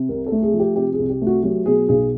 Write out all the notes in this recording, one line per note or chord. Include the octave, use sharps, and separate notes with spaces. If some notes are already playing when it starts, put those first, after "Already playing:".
Already playing: C3
C2 A#4
A4
A3
G#4
F3
G4
C3 G4
G#4
C2
G4
A3
F#4
F#3 G4
B2 G#4
B1 G#4